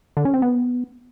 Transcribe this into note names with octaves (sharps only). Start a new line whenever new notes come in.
D3
C#4
C4
B3